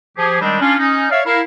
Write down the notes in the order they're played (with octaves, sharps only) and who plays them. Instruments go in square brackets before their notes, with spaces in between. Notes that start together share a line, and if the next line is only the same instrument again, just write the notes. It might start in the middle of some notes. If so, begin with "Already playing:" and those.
[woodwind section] F3 G4 G#4
D#3 G3 G#3 C4 D4 D#4
C#4 D4 F4
C#4 D#4
C#5 D5 E5 F5
E4 A#4 F5